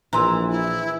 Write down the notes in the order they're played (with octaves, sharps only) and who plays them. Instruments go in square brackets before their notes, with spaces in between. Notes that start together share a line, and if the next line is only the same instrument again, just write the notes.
[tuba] A#1 [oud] E3 [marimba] A#5 C6 E6
[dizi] E4